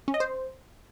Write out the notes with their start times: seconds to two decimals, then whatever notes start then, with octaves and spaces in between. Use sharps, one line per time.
0.08 C#4
0.14 D#5
0.20 C5